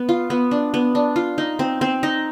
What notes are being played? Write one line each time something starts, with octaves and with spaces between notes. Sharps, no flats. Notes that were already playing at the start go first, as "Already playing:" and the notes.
Already playing: B3
F4
B3
D4
B3
D4
F4
D#4
C4
C4
D#4